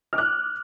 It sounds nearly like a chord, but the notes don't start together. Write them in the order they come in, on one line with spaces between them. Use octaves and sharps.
F6 D6 F#6